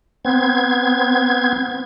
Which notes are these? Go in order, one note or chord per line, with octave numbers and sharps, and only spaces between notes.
B3 C4 G#6